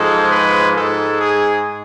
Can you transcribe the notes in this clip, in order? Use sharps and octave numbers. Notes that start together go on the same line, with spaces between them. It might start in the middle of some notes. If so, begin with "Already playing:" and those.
Already playing: G#2 F3 G#3 A4
B4
G#2 G#3 A4
G#4